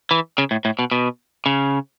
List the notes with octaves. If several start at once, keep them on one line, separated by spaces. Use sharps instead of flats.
E3
C#3
A2
A2
B2
B2
C#3